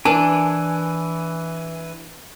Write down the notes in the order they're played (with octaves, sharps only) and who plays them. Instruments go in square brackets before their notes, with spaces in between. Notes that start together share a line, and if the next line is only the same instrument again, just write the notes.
[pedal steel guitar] E3 G#5 [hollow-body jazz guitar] D4 [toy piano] A#4 B4 A5